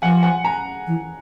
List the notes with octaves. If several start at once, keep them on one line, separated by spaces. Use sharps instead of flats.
F3 F#5 G#5
F#5 G#5
G#5 A#5
E3